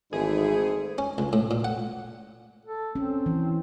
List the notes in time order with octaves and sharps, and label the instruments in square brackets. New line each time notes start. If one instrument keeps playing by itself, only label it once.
[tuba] G#1 [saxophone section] G#2 E3 A3 [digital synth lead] G#4
[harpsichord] C#4
C#2
A2
A#2
F#5
[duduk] A4
[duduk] C4 [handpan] C#4
[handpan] E3